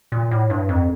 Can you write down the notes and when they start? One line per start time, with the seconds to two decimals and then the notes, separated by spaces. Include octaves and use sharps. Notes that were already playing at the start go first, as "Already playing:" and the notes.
0.12 A#2
0.31 A2
0.50 G2
0.69 F2